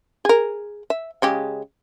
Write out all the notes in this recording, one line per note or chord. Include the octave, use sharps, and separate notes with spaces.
G#4 A#4
E5
C#3 G#3 G4